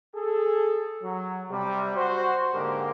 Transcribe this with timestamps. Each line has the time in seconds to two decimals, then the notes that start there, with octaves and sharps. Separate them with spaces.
0.16 G#4 A4
1.03 F#3
1.49 C3 G3
1.96 F#4 C5
2.54 G#2 D3 G#3 A#3 G4 A#4